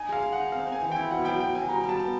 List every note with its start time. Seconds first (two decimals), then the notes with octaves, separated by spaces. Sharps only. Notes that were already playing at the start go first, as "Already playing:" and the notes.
Already playing: D#4 G#5
0.09 G#3 F5
0.22 G#4
0.33 F#5
0.38 D#4
0.52 C4 F5
0.67 C4
0.72 G#5
0.81 E3
0.92 E4 G5
1.11 B2 F#5
1.25 F#3 G5
1.40 B2 G5
1.55 F#3 G#5
1.69 G3 A#5
1.84 G3
1.89 A5
1.99 B3